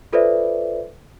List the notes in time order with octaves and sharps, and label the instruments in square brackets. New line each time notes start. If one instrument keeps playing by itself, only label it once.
[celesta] F4 A4 B4 C5 D5 E5